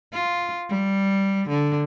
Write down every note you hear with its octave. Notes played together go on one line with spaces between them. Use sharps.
F4
G3
D3